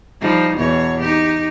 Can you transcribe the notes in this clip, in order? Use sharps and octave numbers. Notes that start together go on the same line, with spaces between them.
F3 G3 D#4
E2 B2 C#5
D#4 G4